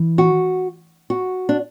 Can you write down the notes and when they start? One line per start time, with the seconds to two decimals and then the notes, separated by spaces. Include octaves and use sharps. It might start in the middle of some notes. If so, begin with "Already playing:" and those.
Already playing: E3
0.18 F#4
1.10 F#4
1.49 D4